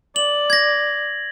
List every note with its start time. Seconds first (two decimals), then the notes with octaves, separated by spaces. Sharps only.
0.16 D5 F#7
0.50 G#6 A#6